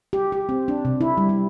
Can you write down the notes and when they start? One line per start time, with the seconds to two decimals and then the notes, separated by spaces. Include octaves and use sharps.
0.13 G4
0.32 G4
0.49 C4
0.68 D4
0.85 C3
1.01 E4
1.17 G3
1.29 G3